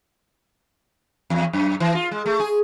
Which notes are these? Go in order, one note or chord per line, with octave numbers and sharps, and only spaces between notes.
E2
F#2
E3
F4
G#3
A3
G#4